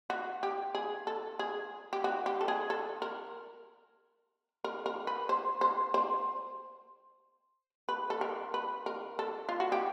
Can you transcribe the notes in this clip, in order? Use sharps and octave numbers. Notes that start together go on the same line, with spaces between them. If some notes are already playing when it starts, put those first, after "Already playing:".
F#4
G4
G#4
A4
G#4
G4
F#4
G4
A4
G#4
A4
A#4
A#4
A#4
B4
C5
C5
C5
B4
A4
A#4
B4
A#4
A4
F4
F#4
G4